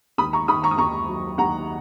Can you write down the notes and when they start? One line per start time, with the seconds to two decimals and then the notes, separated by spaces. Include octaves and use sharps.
0.18 D#2 B5 D#6
0.33 A#5 C#6
0.48 D#3 B5 D#6
0.63 A#5 C#6
0.71 D#6
0.78 D#2 A#5 C#6
1.08 F#3
1.38 D#2 F#5 A#5